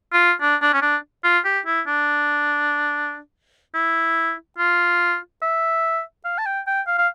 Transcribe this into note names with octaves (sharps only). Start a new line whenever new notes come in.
F4
D4
D4
C#4
D4
F4
G4
E4
D4
E4
F4
E5
F5
A5
G5
G5
F5
F5